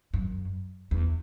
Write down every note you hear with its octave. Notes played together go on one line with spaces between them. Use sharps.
F#2
E2